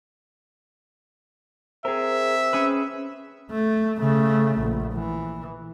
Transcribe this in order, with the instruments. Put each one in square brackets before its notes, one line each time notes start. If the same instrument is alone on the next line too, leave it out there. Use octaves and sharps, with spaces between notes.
[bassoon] C4 [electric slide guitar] G#4 A#4 [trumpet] E5
[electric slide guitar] C#4 G#4 B4
[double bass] A3
C#3 A3
A#1
E3